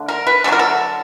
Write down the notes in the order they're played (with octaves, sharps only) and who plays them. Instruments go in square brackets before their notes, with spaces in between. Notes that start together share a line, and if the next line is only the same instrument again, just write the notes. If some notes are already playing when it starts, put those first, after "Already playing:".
Already playing: [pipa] D3 A3
A#4
B4
D3 F#3 A3 A4
A#4
A4